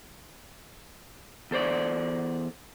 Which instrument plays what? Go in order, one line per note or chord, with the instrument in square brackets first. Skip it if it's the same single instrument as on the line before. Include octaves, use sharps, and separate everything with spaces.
[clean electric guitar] E2 A4 C5 D5